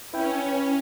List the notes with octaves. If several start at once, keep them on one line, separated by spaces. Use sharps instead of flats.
C#4 E4 B4 G5